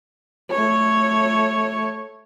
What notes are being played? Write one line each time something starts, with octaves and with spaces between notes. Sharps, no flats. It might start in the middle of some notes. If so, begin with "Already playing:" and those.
A3 C#5